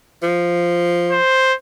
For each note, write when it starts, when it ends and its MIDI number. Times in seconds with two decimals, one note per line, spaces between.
0.23 1.17 53
1.12 1.54 72